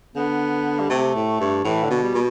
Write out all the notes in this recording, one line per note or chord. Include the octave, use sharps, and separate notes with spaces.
D3 B3
G3
C3 A3
A2
G2
A2 E3
D3
B2
G3
B2